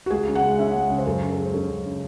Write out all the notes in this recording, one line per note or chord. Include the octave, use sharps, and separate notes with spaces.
F#4
C#2 G#4
C#3
F#5
G#3
C#4 E5
C#2
C#3
C5
F#2 A4
C#3
A4
G#3
C5
C#4 A4
F#2
C#3